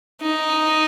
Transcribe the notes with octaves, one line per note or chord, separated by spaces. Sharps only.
D#4